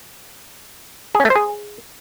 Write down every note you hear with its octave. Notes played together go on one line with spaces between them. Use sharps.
G#4
C#4
A3
C5
G#4